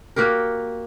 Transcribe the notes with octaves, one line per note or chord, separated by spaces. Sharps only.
A#3 F#4 G4 A#4